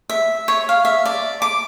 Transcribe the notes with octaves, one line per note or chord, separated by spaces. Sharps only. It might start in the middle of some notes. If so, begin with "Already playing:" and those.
E5
C#5
F5
E5
D5
D6